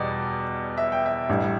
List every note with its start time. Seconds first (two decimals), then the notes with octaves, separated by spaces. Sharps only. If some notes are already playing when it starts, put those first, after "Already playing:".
Already playing: E2 B2 G3 D5
0.77 E5
0.92 G5
1.06 E5
1.29 A1 A2 G3 D4